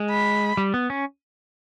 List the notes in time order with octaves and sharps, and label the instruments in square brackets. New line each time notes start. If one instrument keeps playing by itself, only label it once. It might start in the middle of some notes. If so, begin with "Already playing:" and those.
Already playing: [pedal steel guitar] G#3
[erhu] B5
[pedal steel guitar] G3
B3
C#4